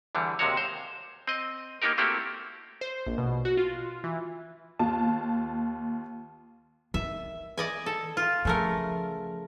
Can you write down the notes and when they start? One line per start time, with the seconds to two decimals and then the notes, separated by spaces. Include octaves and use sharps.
0.15 E2 D3 E3 G3
0.39 D#2 C3 G#3 F#4 C#5
0.57 C5
1.27 C4 D#5
1.82 A#3 B3 D#4 G4 A#4
1.98 A3 A#3 C4 E4 F#4 G4
2.81 C5
3.07 A#1
3.18 B2
3.45 F#4
3.57 F4
4.04 E3
4.79 D#2 F4 A5
6.94 D#3 E5
7.58 D5 D#5 G#5
7.86 A4
8.17 F4
8.45 C#3 F3 A3 A#4